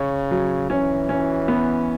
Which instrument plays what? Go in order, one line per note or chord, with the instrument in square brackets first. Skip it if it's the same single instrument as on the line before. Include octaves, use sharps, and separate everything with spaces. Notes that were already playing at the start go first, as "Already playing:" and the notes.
Already playing: [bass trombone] C#3 [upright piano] C#5
[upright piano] F#3
[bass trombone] E3 [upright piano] C#4
[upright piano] C#4
B3